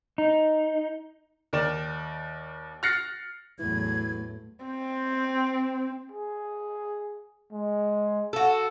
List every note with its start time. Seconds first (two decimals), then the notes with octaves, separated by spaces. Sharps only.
0.18 D#4
1.53 D#2 A#4 D5 E7
2.83 F6 F#6 A6 A#6 C7 C#7
3.59 E2 A2 E3 F#3 G#6
4.65 C4
6.12 G#4
7.52 G#3
8.33 F#4 A4